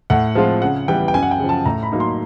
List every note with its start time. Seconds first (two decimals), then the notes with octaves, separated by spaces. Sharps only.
0.10 A2 F#5
0.35 F3 G#3 C4 F4
0.62 C#3 F#5
0.88 E3 G3 B3 G5
1.08 G5
1.14 F#2 G#5
1.23 F#5
1.31 G5
1.39 C#3 F3
1.49 A5
1.66 A2 A#5
1.83 B5
1.92 F#3 A#3 D#4
2.00 C6